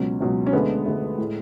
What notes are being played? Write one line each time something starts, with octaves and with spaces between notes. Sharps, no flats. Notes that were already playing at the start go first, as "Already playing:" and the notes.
Already playing: C#2 B2 F#3 C#4
C#2 B2 F#3
C#4
D2 D3 G#3 B3
D2 D3 G#3
A2 G#3